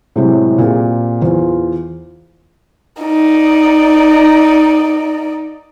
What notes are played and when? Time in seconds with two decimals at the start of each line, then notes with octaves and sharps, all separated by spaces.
0.16 A2 C3 F#3 G#3 E4 G4
0.58 A#2 C4 G4 G#4
1.22 E2 F4 C5
3.02 D#4 D5